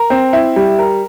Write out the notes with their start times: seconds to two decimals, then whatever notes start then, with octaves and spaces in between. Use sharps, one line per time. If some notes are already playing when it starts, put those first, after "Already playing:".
Already playing: A#4
0.10 C4
0.33 E4
0.56 G3
0.79 A#4